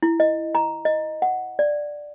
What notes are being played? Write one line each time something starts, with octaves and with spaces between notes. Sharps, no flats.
E4
D#5
A#5
D#5
F#5
D5